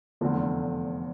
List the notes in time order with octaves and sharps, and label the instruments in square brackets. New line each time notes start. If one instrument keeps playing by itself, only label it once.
[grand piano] F1 E2 D3 F3 C4